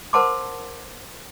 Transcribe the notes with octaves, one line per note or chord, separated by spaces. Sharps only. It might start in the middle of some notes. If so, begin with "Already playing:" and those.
A#4 C5 F#5 A5 C6 D6